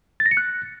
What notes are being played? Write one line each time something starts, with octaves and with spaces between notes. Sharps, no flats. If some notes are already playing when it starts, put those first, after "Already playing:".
A6
A#6
C#7
F#6